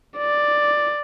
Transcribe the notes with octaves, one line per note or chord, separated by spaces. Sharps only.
D5